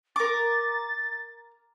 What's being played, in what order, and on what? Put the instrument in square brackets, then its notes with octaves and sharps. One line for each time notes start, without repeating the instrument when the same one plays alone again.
[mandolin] A#4 D6 [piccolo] A6